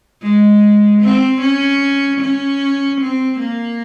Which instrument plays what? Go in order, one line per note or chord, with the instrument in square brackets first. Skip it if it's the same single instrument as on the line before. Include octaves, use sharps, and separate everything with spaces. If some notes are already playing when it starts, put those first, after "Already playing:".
[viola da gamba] G#3
C4
C#4
C#4
C4
A#3